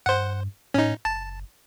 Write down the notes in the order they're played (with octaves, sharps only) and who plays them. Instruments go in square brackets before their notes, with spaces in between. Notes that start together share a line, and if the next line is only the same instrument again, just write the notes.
[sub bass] G2 [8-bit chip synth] C5 F#5
[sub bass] A2 [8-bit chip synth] C#4 D#4
[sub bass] F#1 [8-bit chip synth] A5